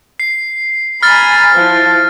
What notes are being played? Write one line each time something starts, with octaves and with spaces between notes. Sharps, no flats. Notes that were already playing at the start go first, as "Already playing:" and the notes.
C7
G#5 A#5 B5 F6 A6
F3 E4